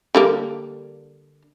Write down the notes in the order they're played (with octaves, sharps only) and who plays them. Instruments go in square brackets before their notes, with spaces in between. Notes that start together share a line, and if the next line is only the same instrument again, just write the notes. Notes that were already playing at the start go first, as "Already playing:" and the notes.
[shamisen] D3 G3 A#3